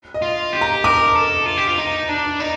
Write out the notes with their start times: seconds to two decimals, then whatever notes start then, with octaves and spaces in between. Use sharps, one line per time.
0.14 D#5
0.22 F4
0.53 G4
0.61 A#5
0.84 A#4 D6
1.15 A4
1.46 F4
1.57 G4
1.67 F4
1.78 D#4
2.09 D4
2.40 D#4